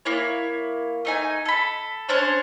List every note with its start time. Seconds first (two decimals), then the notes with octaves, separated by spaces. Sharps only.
0.05 A#3 E4 C#5
1.05 A3 D#4 G#5
1.45 A4 B5
2.09 C#4 D4 C5 C#5